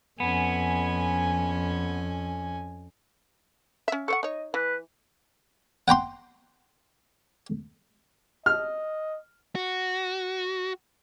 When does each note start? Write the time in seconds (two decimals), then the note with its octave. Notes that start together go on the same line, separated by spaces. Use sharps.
0.20 F2 B3 C#4 G#5
3.88 C#4 E5
4.08 A4 C5 F#5 C#6
4.23 D#4 C#5 D#5
4.54 E3 B4
5.88 F#5 G5 A#5 C6
8.46 D#5 F6
9.55 F#4